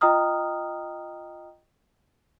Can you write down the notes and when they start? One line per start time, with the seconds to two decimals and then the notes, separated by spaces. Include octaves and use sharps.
0.01 F4 D#5 G5 A#5 D#6 F6